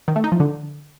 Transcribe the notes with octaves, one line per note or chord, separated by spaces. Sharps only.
D#3
A3
D#4
F3
D3